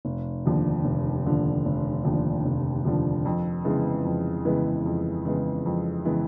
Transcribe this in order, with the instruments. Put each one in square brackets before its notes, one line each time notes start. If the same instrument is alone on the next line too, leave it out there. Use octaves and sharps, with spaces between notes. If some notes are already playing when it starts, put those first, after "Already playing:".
[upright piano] F1
D#2 D3 F3
F1
D#2 D3 F3
F1
D#2 D3 F3
F1
D#2 D3 F3
F2
C#3 E3 G#3 B3
F2
C#3 E3 G#3 B3
F2
C#3 E3 G#3 B3
F2
C#3 E3 G#3 B3